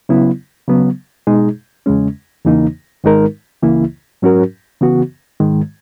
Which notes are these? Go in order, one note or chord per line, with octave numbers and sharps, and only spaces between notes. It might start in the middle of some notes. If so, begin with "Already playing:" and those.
C#3 F#3 B3 E4
C#3 F#3 B3
B2 G#3 D#4 G#4
E2 C#3 G#3 C#4
E2 C#3 E3 A#3 D#4
G#2 D#3 G#3 D#4 A#4
C#2 C#3 E3 A#3 E4
G#2 F#3 C#4 F#4 A#4
C#3 E3 B3 F#4
G#2 D#3 G#3